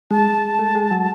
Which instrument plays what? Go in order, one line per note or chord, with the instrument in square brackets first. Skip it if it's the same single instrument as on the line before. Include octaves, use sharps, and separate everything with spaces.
[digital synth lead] G#3 [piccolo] A5
[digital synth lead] A3
G#3
F#3